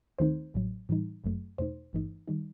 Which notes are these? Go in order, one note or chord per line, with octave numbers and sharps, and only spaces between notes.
D#2 D#3 A3 C4 D#4 C5
A1 A2 F#3
A2 E3 G3 D#4
G1 F#2 F#3 A3
E2 B2 A3 D#4 C5
G1 G2 E3 A3 D#4
D#3 G3 D#4